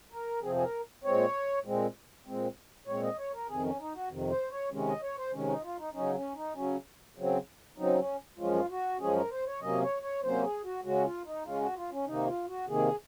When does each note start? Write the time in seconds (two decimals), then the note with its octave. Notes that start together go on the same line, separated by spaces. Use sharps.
0.12 A#4
0.42 F2 C3 F3 C4 G#4
0.55 G#4
0.63 A#4
1.04 A#2 G#3 C4 C#5
1.65 A#2 G#3 C4
2.26 A#2 G#3 C4
2.87 A#2 G#3 C4 C#5
3.03 D#5
3.18 C#5
3.33 A#4
3.49 F2 C3 D#3 G#4
3.64 C#4
3.79 D#4
3.95 F#4
4.10 F2 C3 D#3
4.30 C5
4.51 C#5
4.71 C3 D#3 G#3 C#4
4.87 D#5
5.02 C#5
5.18 C5
5.33 C3 D#3 G#3 C#4
5.48 D#4
5.63 F4
5.79 D#4
5.94 C#3 F#3 C#4 D#4
6.15 C#4
6.35 D#4
6.55 C#3 F#3 C#4
7.17 C#3 F#3 C4
7.78 C#3 F#3 C4 D#4
7.98 C#4
8.39 F#2 F3 G#3 C#4 F4
8.70 F#4
9.00 F#2 F3 G#3 C#4 G#4
9.16 A#4
9.31 C5
9.46 C#5
9.61 C3 F#3 A#3 C#4 D#5
9.82 C#5
10.02 C#5
10.23 C3 F#3 A#3 C#4 C5
10.44 G#4
10.64 F#4
10.84 C#3 G#3 C#4 F#4
11.04 F4
11.25 D#4
11.45 C#3 G#3 C#4 F4
11.61 F#4
11.76 F4
11.91 C#4
12.06 C3 D#3 A#3 D#4
12.27 F4
12.47 F#4
12.68 C3 D#3 A#3 G#4